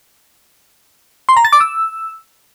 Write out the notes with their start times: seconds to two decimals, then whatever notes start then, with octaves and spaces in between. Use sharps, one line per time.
1.29 C6
1.37 A#5
1.45 A6
1.53 D6
1.60 E6